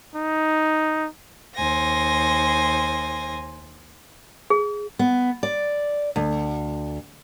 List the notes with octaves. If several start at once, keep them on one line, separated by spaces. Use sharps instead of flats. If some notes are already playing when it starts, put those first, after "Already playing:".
D#4
D#2 C5 G#5 A#6
G#4
B3
D5
D2